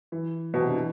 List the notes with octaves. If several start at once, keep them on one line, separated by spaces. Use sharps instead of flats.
E3
B2
C3
D3
E3